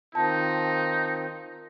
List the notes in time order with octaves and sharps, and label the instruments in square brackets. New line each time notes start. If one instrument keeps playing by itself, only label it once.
[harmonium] D#3 C4 F4 [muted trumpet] D#4 [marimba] A5